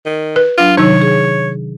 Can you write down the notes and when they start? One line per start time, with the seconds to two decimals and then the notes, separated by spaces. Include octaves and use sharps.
0.06 D#3
0.36 B4
0.58 F#3 D4 F4
0.77 C3 D#3 F#3 D#4 C#5
1.02 G#4